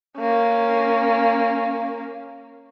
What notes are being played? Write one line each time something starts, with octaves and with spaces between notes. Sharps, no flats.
A#3 C#4